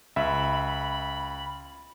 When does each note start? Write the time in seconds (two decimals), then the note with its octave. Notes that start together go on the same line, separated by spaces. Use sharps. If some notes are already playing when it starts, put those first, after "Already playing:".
0.16 C#2 E5 B5